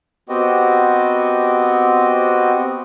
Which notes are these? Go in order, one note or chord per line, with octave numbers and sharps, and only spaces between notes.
B3 C4 F#4 G4 D#5